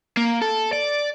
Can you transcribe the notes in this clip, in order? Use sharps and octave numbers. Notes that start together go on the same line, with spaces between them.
A#3
A4
D5